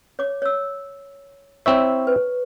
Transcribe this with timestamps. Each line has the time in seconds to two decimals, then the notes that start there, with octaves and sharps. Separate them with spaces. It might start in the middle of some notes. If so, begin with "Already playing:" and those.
0.19 C#5 D6
0.42 C#5 E6
1.66 C4 E4 C#5 E5 C#6
2.07 B4